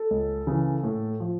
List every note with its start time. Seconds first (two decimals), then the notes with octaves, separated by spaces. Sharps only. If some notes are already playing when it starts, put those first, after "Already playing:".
Already playing: A4
0.10 C#2
0.47 C#3 E3
0.84 A2
1.20 F3